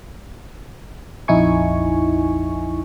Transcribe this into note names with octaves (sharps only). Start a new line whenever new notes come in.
A#1 F2 D#4 E4 G#5 C#6